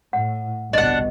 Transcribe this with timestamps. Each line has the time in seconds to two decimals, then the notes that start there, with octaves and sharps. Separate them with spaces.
0.13 A2 F#5
0.73 G1 C2 B2 D4 D#5 F#5